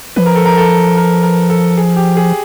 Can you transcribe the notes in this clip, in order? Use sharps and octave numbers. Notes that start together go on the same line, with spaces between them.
F3 B4
A#4
A4
A#4
A4
A#4
A#4
A4
G#4
G4
G#4